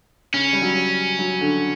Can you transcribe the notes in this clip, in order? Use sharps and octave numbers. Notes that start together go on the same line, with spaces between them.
C#3 C#4
G3
F#3
F#3
D3